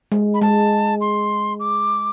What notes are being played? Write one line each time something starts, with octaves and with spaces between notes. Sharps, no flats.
G#3
B5
G#3 A5
C6
D6